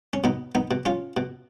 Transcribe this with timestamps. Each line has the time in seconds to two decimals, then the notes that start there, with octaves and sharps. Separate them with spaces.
0.13 C#4
0.24 B2 B3 D#4
0.55 B3 D#4
0.71 B2
0.85 C#4 F4
1.17 B2